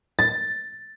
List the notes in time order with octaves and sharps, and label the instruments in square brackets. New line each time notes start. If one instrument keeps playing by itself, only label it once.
[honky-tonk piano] A6